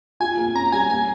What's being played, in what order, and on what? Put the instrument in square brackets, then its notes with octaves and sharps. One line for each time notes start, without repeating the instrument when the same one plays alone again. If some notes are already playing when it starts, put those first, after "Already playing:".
[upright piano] F4 [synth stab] G#5
[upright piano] A#3
[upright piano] C#4 [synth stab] A#5
[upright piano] G3 [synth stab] G#5
[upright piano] A#3 [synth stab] G#5